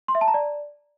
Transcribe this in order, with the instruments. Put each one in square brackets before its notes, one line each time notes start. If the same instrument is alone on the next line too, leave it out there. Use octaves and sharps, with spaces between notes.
[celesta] C6
E5
A5
A#5
D5